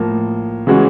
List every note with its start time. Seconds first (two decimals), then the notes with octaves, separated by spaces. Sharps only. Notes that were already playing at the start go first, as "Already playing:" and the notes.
Already playing: A2 F3 A#3
0.67 C#3 E3 G#3 C#4 F#4